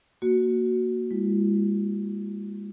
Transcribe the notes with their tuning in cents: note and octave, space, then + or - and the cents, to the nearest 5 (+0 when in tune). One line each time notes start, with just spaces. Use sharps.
A#3 +0 F#4 +0
G#3 -30 E4 +35